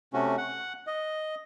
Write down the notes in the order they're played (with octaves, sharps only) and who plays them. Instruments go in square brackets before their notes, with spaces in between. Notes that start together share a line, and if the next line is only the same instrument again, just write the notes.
[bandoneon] C3 A3 C#4 F#4
F#5
D#5